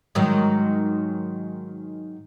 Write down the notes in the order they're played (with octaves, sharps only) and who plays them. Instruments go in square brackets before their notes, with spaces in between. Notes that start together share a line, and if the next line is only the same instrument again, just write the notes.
[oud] G#2 D#3 F#3